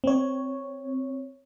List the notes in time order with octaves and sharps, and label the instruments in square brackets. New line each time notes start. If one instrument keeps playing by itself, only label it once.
[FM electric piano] C4 C#5